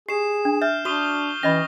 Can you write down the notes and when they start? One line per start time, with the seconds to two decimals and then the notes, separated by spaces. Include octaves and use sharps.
0.09 G4 G#4 C7 E7
0.45 D4
0.62 E5 F6 G6
0.85 D4 F#4 C#6 D#6 G7
1.43 E3 C#4 D#5 B5 A#6